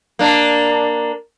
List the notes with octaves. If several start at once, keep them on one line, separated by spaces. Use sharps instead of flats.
A#3 D4